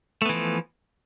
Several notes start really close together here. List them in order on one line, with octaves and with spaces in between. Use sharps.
A3 B3 E3 F3